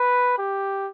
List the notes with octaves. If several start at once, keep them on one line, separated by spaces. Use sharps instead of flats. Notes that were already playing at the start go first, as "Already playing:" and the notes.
Already playing: B4
G4